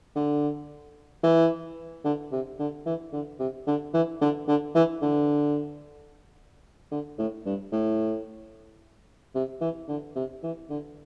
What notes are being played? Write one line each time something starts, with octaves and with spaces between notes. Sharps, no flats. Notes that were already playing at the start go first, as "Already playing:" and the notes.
D3
E3
D3
C3
D3
E3
D3
C3
D3
E3
D3
D3
E3
D3
D3
A2
G2
A2
C3
E3
D3
C3
E3
D3